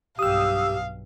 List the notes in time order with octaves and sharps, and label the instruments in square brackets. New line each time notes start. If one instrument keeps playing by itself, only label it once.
[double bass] B1 G2 [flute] G4 [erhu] F5 [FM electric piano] D#6 E6